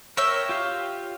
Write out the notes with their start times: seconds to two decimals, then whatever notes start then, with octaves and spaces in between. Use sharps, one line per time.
0.17 A#4 C#5 E5 G5 E6
0.49 F4 G4 F5